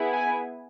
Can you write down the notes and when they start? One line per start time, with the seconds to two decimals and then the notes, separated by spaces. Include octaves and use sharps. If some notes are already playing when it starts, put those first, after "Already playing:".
Already playing: B3 E4 G#4
0.14 G#5